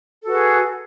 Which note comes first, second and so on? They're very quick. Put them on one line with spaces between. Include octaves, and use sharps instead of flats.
A4 F#4 B4 G#4